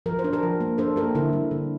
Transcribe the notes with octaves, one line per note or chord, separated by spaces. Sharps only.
F3 A#4
C5
D4
G4 A#4
F3
A#3
D4 A4 C5
A#3 G4 A#4
D3 E4
G3
D3